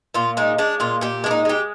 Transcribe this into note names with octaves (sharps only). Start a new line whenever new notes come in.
A#2 F4
G#3 D#4
G#3 D4
A#2 F4
A#2 G4
G#3 D4
D#4
G#3 G4